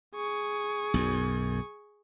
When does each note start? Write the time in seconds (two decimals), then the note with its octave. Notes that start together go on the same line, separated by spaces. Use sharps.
0.15 G#4 C#6
0.94 B1 F#2